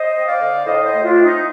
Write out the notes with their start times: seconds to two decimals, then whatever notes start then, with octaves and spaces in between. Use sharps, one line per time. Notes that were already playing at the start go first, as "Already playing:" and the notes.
Already playing: C5 D#5
0.15 C4
0.28 D5 F5
0.40 D3
0.65 A2 C5 D#5
0.85 C5 D#5
0.91 A3
1.04 D4 F4
1.17 C4
1.23 D#4